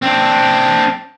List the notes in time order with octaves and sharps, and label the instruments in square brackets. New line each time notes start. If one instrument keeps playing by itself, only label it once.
[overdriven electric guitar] C4 D4